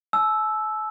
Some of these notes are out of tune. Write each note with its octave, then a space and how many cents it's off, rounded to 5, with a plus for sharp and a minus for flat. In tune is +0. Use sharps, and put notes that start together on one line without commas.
A5 -45 E6 +0